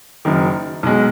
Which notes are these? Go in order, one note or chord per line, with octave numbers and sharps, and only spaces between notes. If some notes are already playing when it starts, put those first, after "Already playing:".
F#1 F#2 D#3
B1 B2 G#3